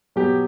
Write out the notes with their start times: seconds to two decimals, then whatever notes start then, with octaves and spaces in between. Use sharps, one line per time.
0.16 B2 F#3 B3 G4